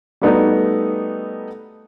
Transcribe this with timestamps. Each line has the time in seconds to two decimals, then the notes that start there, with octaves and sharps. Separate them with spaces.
0.21 G3 A3 B3 D#4 F#4 A4